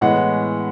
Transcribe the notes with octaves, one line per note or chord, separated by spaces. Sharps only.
A2 E3 G#3 B3 F#5